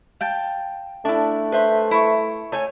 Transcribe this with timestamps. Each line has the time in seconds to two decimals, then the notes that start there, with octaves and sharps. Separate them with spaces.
0.21 F5 G5 A5
1.05 A3 D4 E4
1.52 B4 C5 E5
1.91 E4 C#6
2.52 A3 C#5 G#5